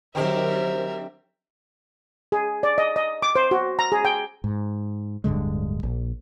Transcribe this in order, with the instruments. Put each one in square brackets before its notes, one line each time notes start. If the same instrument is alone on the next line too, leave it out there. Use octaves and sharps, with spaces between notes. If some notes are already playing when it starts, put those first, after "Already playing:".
[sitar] D3 C4 G4 [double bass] D#3 F#3 [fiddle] A#4 E5 [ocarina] C5
[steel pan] G#4
D5
D#5
D#5
D6
C5
F#4
A#5
G#4
G5
[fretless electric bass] G#2
D1 G2 D3 G#3
A#1